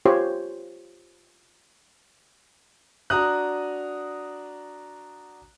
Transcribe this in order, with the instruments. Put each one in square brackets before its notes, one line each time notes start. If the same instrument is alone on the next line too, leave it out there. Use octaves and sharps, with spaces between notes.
[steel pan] F4 G4 C5 C#5
[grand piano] D4 F#4 A#5 D#6 F#6